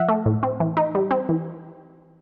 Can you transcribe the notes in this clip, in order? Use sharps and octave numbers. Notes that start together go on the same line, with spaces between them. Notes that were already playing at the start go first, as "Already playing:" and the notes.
Already playing: F3 E5 F#5
A3
A2
C4
E3
D#4
G3
C4
E3